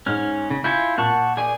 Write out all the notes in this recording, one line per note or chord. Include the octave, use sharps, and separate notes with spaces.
G#2 C#4 F6
C#3
E4 F4 G#5 G6 C#7
A#2 F#5 A5 C#6
G#4 D5 G#5